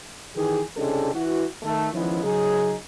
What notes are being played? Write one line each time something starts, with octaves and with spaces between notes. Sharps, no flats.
D#3 E3 G4 G#4
C2 C#3 G3 G#3 D4 A4
E3 F#4
D#3 A3
D#3 F3 G#3 B3 C#4 E4
C#3 F#3 D#4 G#4